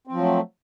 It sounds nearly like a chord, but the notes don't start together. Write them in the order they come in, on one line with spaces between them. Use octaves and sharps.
C4 F3 F#3 A3